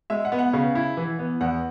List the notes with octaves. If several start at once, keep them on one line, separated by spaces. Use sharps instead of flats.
G#3 E5
F#5
B3
F#5
C#3
E4
E3
B3
E2 F#5